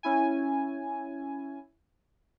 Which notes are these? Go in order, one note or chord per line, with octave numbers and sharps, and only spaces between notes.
C#4 E4 G#5